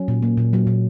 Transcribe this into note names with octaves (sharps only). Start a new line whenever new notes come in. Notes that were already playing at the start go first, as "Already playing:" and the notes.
Already playing: F#3 C#4
A#2
A#3
A#2
F#3
A#2